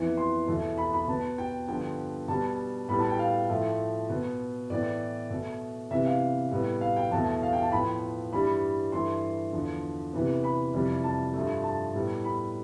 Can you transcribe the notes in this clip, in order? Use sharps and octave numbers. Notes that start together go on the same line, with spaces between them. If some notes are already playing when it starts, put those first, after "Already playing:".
Already playing: F2 E3 B3
C6
E2 B2 A3
B5
B5
B2 B3 A5
G5
G2 D3 F3 B3 G5
B2 G3 B3 A5
A2 G3 B3 B5
A5
G5
F5
A2 F3 A3
B2 B3
A2 E3 B3 D5
B2 A3
C3 E3 B3 E5
F5
A2 G3 B3
F5
G5
E2 B2 A3 A5
F5
G5
A5
A2 F3 B3 B5
G2 E3 G3 B5
G2 E3 A3 C6
E2 D3 F3
C3 E3 B3
B5
F2 C3 E3 G3
A5
G2 F3 A3
A5
A2 G3 B3
B5